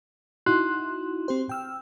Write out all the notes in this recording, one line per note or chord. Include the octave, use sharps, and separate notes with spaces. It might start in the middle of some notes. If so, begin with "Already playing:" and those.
D#4 E4 F#4 C6 F#6
C4 G4 C5
G5 E6 F6